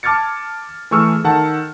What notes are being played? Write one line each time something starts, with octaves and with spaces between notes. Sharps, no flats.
A5 D6 F6 G#6 A6 C#7
E3 A3 G#4 C#6 E6 F6
D#3 A4 F#5 A5